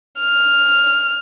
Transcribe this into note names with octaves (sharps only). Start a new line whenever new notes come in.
F6